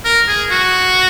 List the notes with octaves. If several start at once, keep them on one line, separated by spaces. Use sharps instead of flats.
A#4
G#4
F#4